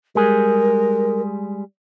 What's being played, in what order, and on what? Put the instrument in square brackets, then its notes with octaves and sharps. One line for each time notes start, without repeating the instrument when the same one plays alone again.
[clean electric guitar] G3 G#3 G#4 [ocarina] A#4